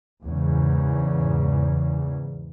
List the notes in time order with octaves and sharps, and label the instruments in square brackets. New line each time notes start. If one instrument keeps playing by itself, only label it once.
[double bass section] E2 G#2 C#3